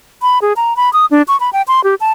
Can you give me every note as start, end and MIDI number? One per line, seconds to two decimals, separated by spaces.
0.22 0.39 83
0.42 0.53 68
0.56 0.76 82
0.77 0.92 83
0.93 1.06 87
1.11 1.22 62
1.28 1.39 85
1.40 1.50 83
1.53 1.62 79
1.68 1.83 84
1.84 1.95 67
2.01 2.12 81